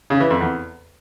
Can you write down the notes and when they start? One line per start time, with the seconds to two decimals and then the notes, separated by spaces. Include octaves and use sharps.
0.10 C#3
0.20 E3
0.30 F2
0.41 E2